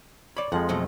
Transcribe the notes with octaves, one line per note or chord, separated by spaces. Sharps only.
C#5 D5 B5
F2 F3 G#3 F#5
B2 F#3 A3